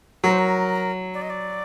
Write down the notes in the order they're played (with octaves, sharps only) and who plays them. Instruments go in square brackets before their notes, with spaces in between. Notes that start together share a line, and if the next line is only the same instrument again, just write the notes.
[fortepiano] F#3 [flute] A#4
[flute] C5
A#4
D5
D#5
D5